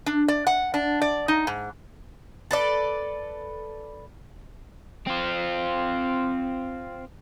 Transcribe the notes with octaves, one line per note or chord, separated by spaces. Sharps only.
D4
D5
F#5
D4
D5
D#4
G#2
A4 B4 D5
C4 F4